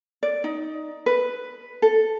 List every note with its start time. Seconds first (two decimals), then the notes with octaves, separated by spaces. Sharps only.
0.23 D5
0.44 D#4
1.06 B4
1.82 A4